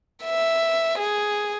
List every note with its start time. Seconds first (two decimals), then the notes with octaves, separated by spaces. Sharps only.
0.24 E5
0.99 G#4